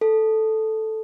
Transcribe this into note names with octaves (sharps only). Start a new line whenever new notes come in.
A4